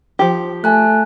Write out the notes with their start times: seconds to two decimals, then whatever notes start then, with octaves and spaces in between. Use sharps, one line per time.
0.19 F3 G4
0.64 A3 G#5 A5 F#6